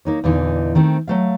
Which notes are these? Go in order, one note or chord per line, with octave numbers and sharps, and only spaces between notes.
A#3 D#4 C#5
E2 A#2 D3 E3 D#4
D#3 A3 C4
F#3 A3 F5